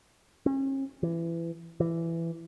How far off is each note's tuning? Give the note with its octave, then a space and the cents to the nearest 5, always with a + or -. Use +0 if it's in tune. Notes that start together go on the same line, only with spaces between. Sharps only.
C#4 -40
E3 +25
E3 +15